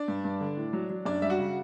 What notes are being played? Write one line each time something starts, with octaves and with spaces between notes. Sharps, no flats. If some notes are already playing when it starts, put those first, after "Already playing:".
Already playing: D4 D5
G2
G2
D3
A2
F#3
F#3
F#2 D4 D5
G3 E5
F#4 F#5
C#3